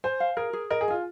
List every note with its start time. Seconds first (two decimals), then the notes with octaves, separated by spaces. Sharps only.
0.04 C5 G#5
0.20 F5
0.37 G#4 A#4
0.53 G#4
0.70 A#4 D#5
0.81 G#4
0.88 F4 G#5